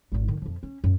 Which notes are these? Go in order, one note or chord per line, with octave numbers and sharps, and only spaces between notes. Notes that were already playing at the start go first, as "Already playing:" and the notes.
G#1 E2
D3 D#3
F2 F3
C#4
F#2